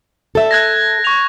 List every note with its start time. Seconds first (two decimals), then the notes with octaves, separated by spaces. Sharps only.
0.35 A4 E5
0.51 F#6 G#6 A#6
1.04 C#6 F7